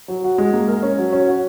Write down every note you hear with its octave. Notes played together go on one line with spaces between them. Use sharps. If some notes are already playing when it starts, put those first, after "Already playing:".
F#3
F#4
G#3
A#3
A#4
C#4
F#3
C#4
F#4